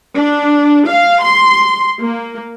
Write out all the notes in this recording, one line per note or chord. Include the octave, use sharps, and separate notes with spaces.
D4
F5
C6
A#3